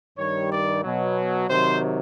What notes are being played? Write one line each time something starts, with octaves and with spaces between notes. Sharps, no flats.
G2 D#3 G3 C#5
D5
B2 F#3
C3 D#3 F#3 C5